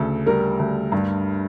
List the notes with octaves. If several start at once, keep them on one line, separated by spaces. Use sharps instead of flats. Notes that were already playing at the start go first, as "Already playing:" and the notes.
Already playing: D2 C#3 A4
G3 A#4
D2
G2